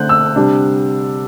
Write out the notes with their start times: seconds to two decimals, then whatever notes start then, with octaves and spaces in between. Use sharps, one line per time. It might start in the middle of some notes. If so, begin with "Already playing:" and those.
Already playing: D3 A3 C4 F#6 G6
0.09 E6
0.36 C3 G3 D4